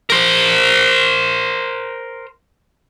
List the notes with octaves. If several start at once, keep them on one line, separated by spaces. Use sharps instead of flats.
A#4 C5